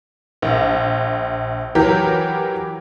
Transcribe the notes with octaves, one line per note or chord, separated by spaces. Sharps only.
A#1
E3 F#3 G4 A#4